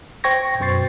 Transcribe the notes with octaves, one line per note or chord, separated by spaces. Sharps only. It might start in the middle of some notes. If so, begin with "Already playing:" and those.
C5 G5 C#6 G#6 A#6
F#2 B2 C5 C#6 A6 C7